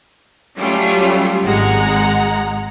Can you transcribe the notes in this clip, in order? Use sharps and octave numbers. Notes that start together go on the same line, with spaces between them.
F#3 G3 A3 C#4 F4
G#1 G#3 F#5 A#5